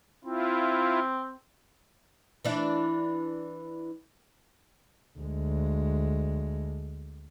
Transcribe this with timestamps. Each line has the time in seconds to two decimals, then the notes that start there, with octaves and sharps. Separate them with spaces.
0.25 C4 E4 F4
2.45 E3 D4 E4
5.19 D2 G#3